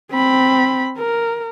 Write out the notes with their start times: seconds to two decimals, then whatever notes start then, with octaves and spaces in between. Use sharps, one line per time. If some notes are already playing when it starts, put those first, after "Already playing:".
0.11 C4 B5
0.98 A#4